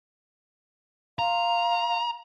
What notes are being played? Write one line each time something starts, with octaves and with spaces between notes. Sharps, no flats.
F5 A#5 C6